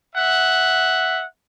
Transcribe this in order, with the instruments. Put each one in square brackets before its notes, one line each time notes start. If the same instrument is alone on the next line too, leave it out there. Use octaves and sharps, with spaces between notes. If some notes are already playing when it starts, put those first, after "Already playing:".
[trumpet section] E5 F#5